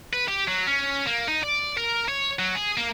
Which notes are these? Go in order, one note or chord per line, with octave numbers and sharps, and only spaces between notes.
B4
G4
F#3
C#4
A#3
D#4
D5
A#4
C#5
F#3
G#4
A#3